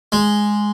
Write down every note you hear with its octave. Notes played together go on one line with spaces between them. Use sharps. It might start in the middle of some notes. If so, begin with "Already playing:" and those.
G#3